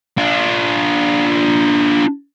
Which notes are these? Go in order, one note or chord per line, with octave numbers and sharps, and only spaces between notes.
D4 F4